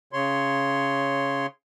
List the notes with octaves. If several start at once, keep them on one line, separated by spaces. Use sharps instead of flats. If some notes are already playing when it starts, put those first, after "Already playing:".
C#3 C#5 C6